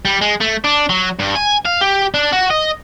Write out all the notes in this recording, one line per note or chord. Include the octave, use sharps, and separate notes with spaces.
G3
G#3
A3
D4
F#3
G2
G#5
F5
G4
D4
F#4
D#5